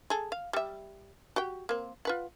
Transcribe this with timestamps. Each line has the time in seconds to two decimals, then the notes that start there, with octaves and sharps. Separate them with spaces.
0.10 G#4 A4
0.32 F5
0.53 G3 E5
1.36 F#4 G4 G5
1.69 A#3 C4
2.05 F4 B4 F#5